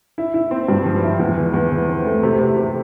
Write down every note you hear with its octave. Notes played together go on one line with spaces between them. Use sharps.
E4
E4
C4
G2
F3
E4
E2
E3
E2
E3
C4
A3
C3
C3
C3